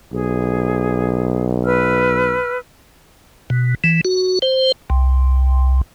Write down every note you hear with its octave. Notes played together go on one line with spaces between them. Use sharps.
B1 G#4
B4 E6 F6
B2
E3
F#4
C5
C2